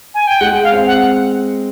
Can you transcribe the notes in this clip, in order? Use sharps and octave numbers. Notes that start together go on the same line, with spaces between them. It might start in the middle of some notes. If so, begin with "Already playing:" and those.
G#5
G5
G#3 F#5
F5
C4
F#5